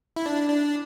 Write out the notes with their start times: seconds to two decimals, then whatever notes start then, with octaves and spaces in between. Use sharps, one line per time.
0.16 E4
0.26 D4
0.49 D4